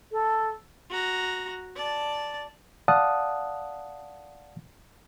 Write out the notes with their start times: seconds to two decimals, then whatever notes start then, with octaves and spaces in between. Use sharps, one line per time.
0.11 A4
0.90 F#4 A#5
1.76 D5 A5
2.88 D5 F5 F#5 A5 D#6